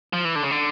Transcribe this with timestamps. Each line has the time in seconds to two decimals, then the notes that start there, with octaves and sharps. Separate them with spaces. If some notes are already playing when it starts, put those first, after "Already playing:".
0.13 F3
0.25 E3
0.36 D3
0.43 C#3
0.51 D3